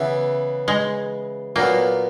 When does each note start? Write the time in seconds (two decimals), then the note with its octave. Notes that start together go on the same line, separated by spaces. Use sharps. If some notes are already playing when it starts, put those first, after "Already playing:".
Already playing: C#3 E3 B3 E4
0.68 G#3
1.56 A#2 F#3 A#3 B3